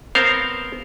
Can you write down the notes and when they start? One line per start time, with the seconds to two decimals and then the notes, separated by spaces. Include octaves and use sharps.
0.15 B3 C4 A#4 C5 C#5 F5